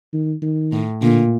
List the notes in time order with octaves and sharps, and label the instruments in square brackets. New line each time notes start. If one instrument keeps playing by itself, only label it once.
[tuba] D#3
D#3
[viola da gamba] A2
[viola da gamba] A#2 [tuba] D3